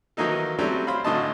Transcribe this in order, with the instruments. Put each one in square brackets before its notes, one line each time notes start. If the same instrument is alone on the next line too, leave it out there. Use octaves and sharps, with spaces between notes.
[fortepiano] D#3 E3 F#3 A#3 D#4 A4
F#3 G3 A3 C4 C#4
C5 F5 B5
G#1 A2 D3 F#4 D#5 A5